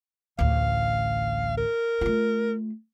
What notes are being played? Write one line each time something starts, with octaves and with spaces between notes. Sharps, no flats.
A1 D2 F5
A#4
A3 F4